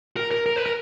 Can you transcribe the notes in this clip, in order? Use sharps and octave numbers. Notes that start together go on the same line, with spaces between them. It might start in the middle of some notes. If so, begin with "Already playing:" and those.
A#4
A#4
A#4
B4
A#4